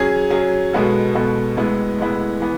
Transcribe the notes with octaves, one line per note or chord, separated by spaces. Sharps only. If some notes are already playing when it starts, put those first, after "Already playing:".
Already playing: F#3 C#4 G#4
F#3 C#4 G#4
B2 G#3 B3 F#4 A4
B2 G#3 B3 F#4 A4
A2 G#3 B3 E4
A2 G#3 B3 E4
E3 B3